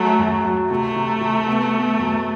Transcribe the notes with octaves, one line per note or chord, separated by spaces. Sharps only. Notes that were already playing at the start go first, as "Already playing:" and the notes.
Already playing: F#3 A3
F#2
F#3
C3 A3
C3
C3
B3
B3
F#2